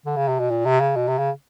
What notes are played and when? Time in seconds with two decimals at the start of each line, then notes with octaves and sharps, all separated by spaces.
0.06 D3
0.17 C#3
0.28 C3
0.40 B2
0.50 A#2
0.66 C3
0.80 C#3
0.96 B2
1.08 C3
1.19 C#3